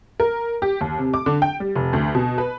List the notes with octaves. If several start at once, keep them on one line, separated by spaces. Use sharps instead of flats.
A#4
G4
D#2
C3
D6
D3
G5
G3
F1
D2
B2
B4